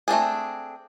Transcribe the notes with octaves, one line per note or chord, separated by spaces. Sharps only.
A3 C4 D4 G#4